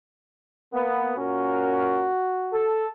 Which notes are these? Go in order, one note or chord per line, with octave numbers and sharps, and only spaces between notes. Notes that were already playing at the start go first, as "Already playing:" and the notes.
A#3 B3
A#2 C#4 F#4 A#4
A4